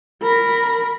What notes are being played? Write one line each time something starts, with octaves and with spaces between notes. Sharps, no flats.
A#4 B5